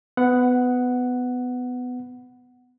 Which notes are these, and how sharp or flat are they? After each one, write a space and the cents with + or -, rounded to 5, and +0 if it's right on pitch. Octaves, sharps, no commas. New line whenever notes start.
B3 +20 F#5 +0 B5 +25